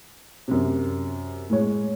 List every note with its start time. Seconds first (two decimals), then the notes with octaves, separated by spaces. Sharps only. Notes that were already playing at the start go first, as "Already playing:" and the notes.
0.48 F#2 C3
1.50 A2 G#3 C#5